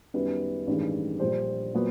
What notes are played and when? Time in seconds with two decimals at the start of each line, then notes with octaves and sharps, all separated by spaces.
0.14 F#2 D#3 G3 B3 B4
0.67 A1 G2 D#3 G#3
1.20 A#1 A#2 G3 C5
1.74 A#2 F#3 B3